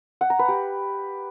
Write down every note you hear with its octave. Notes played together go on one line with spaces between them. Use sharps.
F#5
A#5
B4
G4